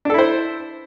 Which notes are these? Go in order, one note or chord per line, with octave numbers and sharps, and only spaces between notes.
D4 E4 A4 C5